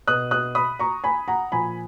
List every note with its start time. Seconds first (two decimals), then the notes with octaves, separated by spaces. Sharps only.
0.07 B2 D#6 F#6
0.31 D#6 F#6
0.55 B5 D#6
0.79 A#5 C#6
1.04 G#5 B5
1.28 F#5 A#5
1.52 A#2 F3 G#5 B5